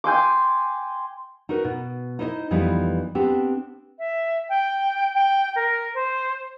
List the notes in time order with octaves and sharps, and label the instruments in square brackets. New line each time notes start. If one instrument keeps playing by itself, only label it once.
[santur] G5 G#5 C6 D6
[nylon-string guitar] D#4 F#4 A#4 B4
B2
D#4 E4 C5 C#5 D#5
F2 E3 G3 B3 D#4
B3 C4 D4 G4
[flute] E5
G5
G5
A#4
C5